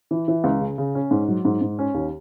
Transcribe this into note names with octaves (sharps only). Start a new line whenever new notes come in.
E3
E3
C#2
C#3
C#3
C#4
G#2
F#3
G#2
G#2
C#4
D#2